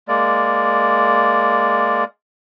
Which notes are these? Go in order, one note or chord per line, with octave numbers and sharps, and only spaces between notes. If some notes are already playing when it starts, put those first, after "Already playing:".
G#3 A#3 D5